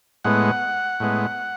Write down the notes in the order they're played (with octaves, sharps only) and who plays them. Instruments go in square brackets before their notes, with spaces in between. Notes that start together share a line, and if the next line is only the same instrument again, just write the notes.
[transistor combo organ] A2 G#3 B3 F#5
A2 G#3 B3